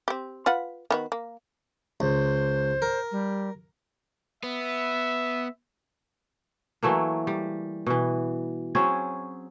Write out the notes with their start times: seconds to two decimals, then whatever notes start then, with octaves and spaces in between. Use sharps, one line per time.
0.08 C4 G4
0.46 F4 B4 F#5
0.90 D#3 B3 F#4
1.12 A#3
2.00 C#2 C5
2.82 A#4
3.11 G3
4.43 B3 E5
6.83 E3 F#3 A3 A#3
7.27 G3
7.86 B2 E3
8.75 F#3 C4 C#4 G#4